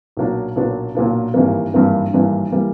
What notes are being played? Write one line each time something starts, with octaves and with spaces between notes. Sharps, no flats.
B1 A#2 F#3 A#3 D4
B1 A#2 F#3 A#3 D4
B1 A#2 F#3 A#3 D4
G#1 G2 E3 G3 A#3
G#1 G2 E3 G3 A#3
G#1 G2 E3 G3 A#3
E3 G3 A#3